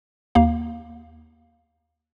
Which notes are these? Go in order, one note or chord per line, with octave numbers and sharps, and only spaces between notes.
D#2 A#3 F5